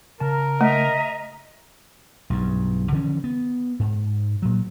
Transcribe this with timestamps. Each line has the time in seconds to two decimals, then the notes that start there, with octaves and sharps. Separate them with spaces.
0.20 C#3 A#4 A5
0.61 A3 D#5 E5 A#5
2.30 B1 G2
2.92 D3 E3 F3 C#4
3.24 B3
3.80 G#2
4.42 A#2 F#3